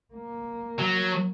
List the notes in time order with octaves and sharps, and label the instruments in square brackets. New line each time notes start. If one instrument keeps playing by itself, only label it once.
[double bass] A#3
[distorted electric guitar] F#3